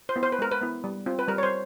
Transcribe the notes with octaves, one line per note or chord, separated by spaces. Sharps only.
C5
B3 E4
C5
B4
G#3 A#4
B4
B3 E4
G3
C4 F4
B4
G3 A#4
C#5
C5